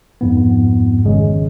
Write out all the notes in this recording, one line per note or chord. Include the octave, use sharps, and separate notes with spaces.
F2 G#2 B3
G#1 C#3 G#3